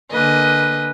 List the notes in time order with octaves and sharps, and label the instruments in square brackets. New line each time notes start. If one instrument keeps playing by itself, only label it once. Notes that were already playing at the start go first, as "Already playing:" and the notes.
[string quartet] D3 A#3 B4 D#5 G#5